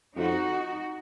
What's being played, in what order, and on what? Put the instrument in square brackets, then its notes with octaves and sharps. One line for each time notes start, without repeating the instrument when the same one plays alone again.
[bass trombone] F2 [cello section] D#4 F#4